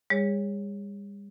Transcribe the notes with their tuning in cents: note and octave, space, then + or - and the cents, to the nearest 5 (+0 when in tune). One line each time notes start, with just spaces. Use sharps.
G3 +40 G#4 -35 C#5 +0